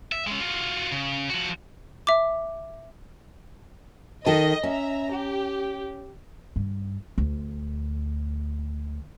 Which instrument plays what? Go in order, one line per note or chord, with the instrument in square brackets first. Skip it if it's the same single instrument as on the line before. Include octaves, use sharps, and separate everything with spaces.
[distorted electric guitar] E5
G#3 C#4
F4 F#4
C#3
F3 F#4
[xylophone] E5 D6
[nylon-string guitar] D#3 A4 [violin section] D#5
[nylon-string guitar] C#4 [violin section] E5 A#5
[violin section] G4
[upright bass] G2
D2